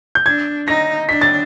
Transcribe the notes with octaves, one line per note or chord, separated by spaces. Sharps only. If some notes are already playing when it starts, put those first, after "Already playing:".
G6
D4 G#6
D#4 A#6
D4 B6
A6